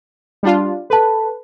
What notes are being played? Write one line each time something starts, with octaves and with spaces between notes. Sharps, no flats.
G3 D4 F4
A4 B4 A5